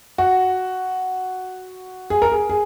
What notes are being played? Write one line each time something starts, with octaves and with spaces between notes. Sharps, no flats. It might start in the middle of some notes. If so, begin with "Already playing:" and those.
F#4
G#4
A#4
G#4
G#4